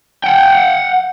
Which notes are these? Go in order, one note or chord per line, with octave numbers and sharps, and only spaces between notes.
F#5 G5